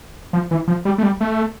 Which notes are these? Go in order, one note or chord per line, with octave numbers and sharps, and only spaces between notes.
F3
E3
F3
G3
A3
G3
A3